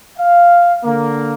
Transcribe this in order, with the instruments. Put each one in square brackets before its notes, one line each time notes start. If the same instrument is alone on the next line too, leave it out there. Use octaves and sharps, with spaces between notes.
[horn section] F5
D3 A#3